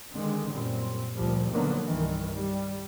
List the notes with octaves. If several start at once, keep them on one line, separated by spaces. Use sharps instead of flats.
D3 D#3 G#3 C4
F#2 A#2 G3 C4
D2 A#2 F3 G3
D3 D#3 F3 F#3 A#3 B3
C2 G2 D#3 E3
G3